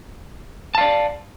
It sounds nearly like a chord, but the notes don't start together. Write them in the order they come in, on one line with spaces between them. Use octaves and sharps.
A5 F5 D5